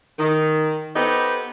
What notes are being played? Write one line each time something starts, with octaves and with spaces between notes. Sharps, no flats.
D#3
B3 D#4 G4 A4 C5